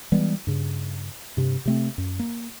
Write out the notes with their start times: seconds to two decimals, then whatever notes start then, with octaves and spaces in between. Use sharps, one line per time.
0.12 E3 G3 G#3 B3
0.47 G2 C#3
1.37 G2 C3
1.65 C3 A3 C4
1.98 F#2
2.20 A#3